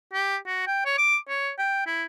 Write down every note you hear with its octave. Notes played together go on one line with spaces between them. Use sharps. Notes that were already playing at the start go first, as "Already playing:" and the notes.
G4
F#4
G5
C#5
D6
C#5
G5
E4